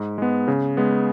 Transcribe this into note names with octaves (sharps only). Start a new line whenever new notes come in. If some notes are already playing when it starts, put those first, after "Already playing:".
Already playing: G#2
G#3 B3
C#3
G#3 B3